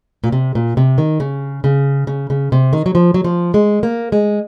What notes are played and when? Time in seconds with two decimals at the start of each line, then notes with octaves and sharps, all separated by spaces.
0.24 A#2
0.32 C3
0.55 A#2
0.77 C3
0.98 D#3
1.20 C#3
1.64 C#3
2.07 C#3
2.30 C#3
2.52 C3
2.73 D#3
2.86 F#3
2.95 F3
3.14 F#3
3.24 F3
3.54 G#3
3.83 A#3
4.12 G#3